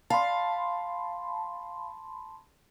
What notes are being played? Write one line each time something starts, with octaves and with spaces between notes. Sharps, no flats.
F5 A5 B5 C6